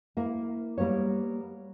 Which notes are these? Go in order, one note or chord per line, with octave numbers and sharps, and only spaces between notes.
A#3 E4
G3 A#3 B3 C#5